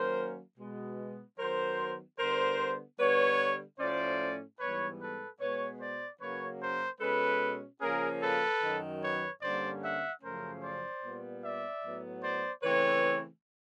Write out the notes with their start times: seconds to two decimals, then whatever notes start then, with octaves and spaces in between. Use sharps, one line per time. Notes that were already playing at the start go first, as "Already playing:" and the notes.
Already playing: D#3 F#3 A#3 C#4 A#4 C5
0.57 B2 G#3 B3
1.38 D#3 F#3 B3 A#4 C5
2.19 D3 G3 B3 A#4 C5
2.99 D3 G3 B3 B4 C#5
3.79 A2 F3 A3 C#4 C5 D5
4.59 G#2 E3 G3 B3 B4 C#5
4.99 A4 B4
5.40 B2 G#3 B3 B4 C#5
5.80 C5 D5
6.20 C#3 F#3 A#3 C#4 B4 C#5
6.60 A#4 C5
7.00 B2 G#3 C#4 A4 B4
7.81 C#3 F3 A#3 C#4 G#4 A#4
8.21 A4 B4
8.62 F#2 D#3 F#3
9.01 B4 C#5
9.41 G2 D3 G3 A#3 C#4 C5 D5
9.82 E5 F#5
10.22 F#2 C#3 F3 A3 C#4 A#4 C5
10.62 C5 D5
11.02 A#2 G3 B3
11.42 D5 E5
11.83 A2 F#3 B3
12.23 C5 D5
12.63 C#3 E3 A3 C4 B4 C#5